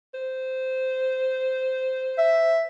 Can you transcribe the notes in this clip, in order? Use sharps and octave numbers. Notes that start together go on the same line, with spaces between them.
C5
E5